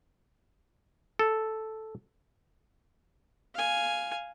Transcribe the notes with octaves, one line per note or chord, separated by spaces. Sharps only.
A4
F5 G#5